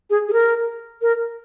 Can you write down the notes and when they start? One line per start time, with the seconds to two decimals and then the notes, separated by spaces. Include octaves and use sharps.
0.10 G#4
0.28 G#4
0.33 A#4
1.02 A#4